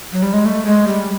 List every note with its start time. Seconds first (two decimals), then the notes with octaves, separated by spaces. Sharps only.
0.12 F#3
0.23 G3
0.34 G#3
0.45 A3
0.66 G#3
0.87 G3